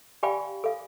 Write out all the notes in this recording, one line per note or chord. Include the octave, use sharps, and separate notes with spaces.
G4 D5 F5 G5 G#5 B5
A4 F5